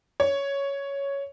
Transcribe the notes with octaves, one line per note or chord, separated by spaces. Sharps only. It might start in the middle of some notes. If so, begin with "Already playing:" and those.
C#5